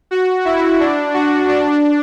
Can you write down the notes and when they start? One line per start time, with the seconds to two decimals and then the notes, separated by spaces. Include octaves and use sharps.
0.11 F#4
0.45 E4
0.80 D4
1.14 F#4
1.49 D4